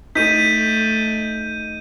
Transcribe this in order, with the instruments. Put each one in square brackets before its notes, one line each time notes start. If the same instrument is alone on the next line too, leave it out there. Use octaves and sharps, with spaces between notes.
[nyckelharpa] A3 [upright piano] D#4 [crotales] G6 D#7 [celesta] B6